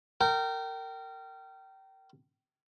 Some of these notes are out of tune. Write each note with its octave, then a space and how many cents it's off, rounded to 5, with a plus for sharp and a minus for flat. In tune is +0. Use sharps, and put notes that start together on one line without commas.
A#4 -25 G5 -25